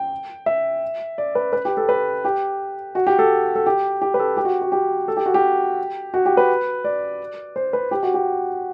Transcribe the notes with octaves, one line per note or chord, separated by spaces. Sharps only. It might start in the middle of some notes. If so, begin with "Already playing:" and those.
Already playing: G5
E5
D5
B4
B4
G4
A4
B4
G4
F#4
G4
A4
A4
G4
G4
B4
A4
G4
F#4
F#4
G4
A4
G4
F#4
G4
F#4
G4
B4
D5
C5
B4
G4
F#4
G4